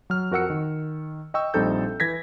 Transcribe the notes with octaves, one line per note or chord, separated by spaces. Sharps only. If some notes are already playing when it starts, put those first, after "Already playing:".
F#3 F6
F2 F#4 A#4 F#5 E6 C#7
D#3
D#5 G5 C#6 E6
A#1 G3 C4 D#4 A4 G6
E3 G#6 A#6 B6